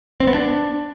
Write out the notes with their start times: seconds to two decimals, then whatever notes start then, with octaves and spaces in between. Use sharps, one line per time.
0.20 C4
0.27 B3
0.34 D4